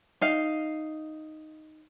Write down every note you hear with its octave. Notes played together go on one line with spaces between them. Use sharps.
D#4 F5